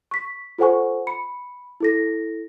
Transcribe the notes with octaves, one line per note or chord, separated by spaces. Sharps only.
C#6 B6
F4 A4 C5 F#5 G#5 C#6
B5 C#7
E4 A4 A#6